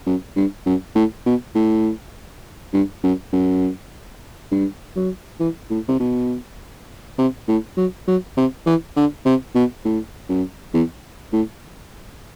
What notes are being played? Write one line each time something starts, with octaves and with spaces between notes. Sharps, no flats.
F#2
G2
F#2
A2
B2
A2
G2
F#2
F#2
G2
F#3
E3
A2
C3
B2
C3
A2
F#3
F#3
C3
E3
D3
C3
B2
A2
F#2
E2
A2